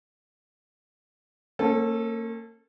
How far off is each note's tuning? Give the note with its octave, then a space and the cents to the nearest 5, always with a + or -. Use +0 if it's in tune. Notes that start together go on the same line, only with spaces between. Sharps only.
A#3 -35 C#4 -35 A4 +0